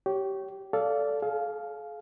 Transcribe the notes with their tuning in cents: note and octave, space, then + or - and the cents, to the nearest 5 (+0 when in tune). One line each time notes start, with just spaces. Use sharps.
G4 -20 C#5 +0
A4 +0 D5 -25 F5 -10
G#4 +45 F5 +0